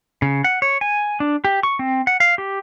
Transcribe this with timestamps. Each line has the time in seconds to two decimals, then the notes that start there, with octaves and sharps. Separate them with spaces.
0.22 C#3
0.44 F#5
0.62 C#5
0.81 G#5
1.20 D4
1.44 G4
1.63 C#6
1.79 C4
2.07 F#5
2.20 F5
2.38 G4